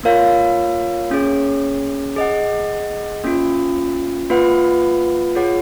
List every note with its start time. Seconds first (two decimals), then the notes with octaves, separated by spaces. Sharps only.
0.03 A#3 F4 A#4 C#5 F5
1.10 A#3 C#4 G#4 C#5
2.16 G#4 D#5 F#5
3.24 A#3 C#4 F4
4.30 A#3 F4 B4 F#5
5.35 F4 G#4 C#5 F#5